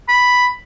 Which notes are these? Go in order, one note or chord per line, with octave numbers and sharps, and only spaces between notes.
B5